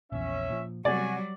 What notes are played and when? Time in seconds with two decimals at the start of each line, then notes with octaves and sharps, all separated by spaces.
0.12 A#1 E2 C#4 E5
0.50 A#2 F3
0.85 C3 F#3 G3 F#4 D5 G#5